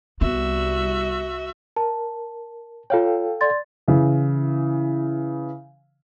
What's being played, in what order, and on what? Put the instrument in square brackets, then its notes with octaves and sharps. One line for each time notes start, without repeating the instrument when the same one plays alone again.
[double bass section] C2 G3 [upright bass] B3 [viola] F#4 E5
[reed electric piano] A#4 [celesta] A5
[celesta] F4 C#5 [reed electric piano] A4 F5 G5
[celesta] D5 C6 A6
[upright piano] C#3 E3